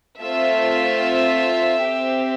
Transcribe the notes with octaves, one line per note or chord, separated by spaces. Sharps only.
A3 C4 F4 E5
C4 G4